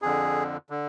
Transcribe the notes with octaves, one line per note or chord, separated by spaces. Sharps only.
F2 D3 G#4
D3